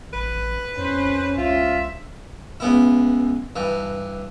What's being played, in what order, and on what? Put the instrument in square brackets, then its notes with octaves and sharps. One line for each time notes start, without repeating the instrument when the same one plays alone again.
[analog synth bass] A1 [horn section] B4
[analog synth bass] F2 [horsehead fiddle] C#4 [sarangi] C5
[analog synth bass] C#2 [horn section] F4 [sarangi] E5
[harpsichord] C#2 B3 E4
G2 E3